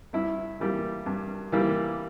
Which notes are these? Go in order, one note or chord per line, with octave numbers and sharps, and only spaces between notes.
G2 E4
E3 G3 A#3
G2
E3 G3 A#3